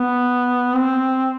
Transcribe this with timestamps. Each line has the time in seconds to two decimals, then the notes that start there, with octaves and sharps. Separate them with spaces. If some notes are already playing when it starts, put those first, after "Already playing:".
Already playing: B3
0.74 C4